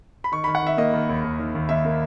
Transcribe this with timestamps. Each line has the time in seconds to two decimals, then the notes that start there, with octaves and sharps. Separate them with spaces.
0.24 B5
0.32 D#3 C#6
0.44 D#3 B5
0.55 F#5
0.63 D#3 E5
0.77 A#3 D#5
0.94 D#3
1.09 D#2
1.24 D#2
1.39 D#3
1.55 D#2
1.69 D#2 E5
1.85 A#3